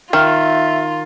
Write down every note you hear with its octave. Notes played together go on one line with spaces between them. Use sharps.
D#3 F4 E5 F6